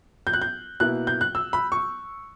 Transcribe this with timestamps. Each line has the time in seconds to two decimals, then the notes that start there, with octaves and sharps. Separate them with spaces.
0.27 G6
0.33 F#6
0.41 G6
0.80 B2 A#3 E4 F#6
1.07 G6
1.21 F#6
1.35 E6
1.53 B5
1.72 C#6